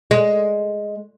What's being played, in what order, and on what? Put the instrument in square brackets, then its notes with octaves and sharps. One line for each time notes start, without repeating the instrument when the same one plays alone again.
[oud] G#3